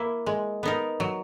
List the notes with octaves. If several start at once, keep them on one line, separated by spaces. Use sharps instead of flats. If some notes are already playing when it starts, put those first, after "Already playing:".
Already playing: A#3 E4
G#3
B3 D#4 A#4
F#3